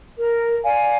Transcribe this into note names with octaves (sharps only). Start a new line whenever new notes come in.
A#4
D5 F5 G#5